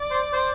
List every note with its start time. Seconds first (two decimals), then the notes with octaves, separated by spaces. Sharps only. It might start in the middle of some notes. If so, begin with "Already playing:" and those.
Already playing: D5
0.11 C5
0.34 C5